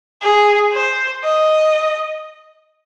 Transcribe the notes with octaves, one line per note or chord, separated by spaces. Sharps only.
G#4
C5
D#5